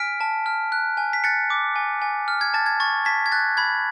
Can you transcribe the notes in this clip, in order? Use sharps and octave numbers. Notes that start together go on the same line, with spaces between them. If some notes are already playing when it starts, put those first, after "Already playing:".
Already playing: G#5 F6 B6 D7
A5
F6
F#6
G#5
B6
F#6 A6 C#7
D6
G#5
G#5
F6
G#6
A5 A6
G#6
C#6 A6
A5 G#6 B6
G#6
F#6 A6
B5 G#6